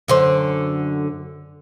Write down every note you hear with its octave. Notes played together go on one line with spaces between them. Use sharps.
F#2 D3 C5